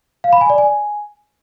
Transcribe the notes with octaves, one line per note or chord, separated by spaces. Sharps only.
F5
B5
G#5
D5
G#5